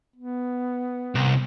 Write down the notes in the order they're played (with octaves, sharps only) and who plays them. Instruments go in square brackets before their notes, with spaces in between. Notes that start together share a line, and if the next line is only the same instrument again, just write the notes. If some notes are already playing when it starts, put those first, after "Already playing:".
[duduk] B3
[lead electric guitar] C2